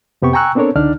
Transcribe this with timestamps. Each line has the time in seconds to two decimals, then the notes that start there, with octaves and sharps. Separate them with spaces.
0.22 F2 C3 B3 G4 C#6
0.33 G5 G#5 A#5 C#6 E6 F#6
0.55 B3 C4 D4 A4 A#4 C#5
0.76 C#2 D3 D4 D#4 D5 F6